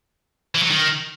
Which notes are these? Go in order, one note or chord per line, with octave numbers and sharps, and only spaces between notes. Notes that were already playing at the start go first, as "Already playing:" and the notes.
E3
F#3
D#3